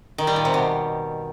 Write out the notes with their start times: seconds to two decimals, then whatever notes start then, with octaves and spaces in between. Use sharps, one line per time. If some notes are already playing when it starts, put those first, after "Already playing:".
0.18 D#3
0.27 G3
0.36 A#2
0.45 C3
0.54 B2